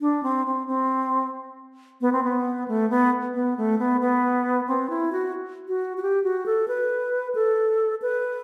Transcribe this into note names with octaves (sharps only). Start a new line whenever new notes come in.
D4
C4
C4
C4
B3
C4
B3
A3
B3
B3
A3
B3
B3
C4
E4
F#4
F#4
F#4
G4
F#4
A4
B4
A4
B4